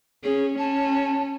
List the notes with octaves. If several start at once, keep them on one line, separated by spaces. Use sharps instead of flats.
C#4 G#4
C#4 A5